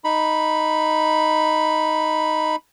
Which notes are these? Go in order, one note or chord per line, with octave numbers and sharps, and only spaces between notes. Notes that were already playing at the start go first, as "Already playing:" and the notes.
D#4 B5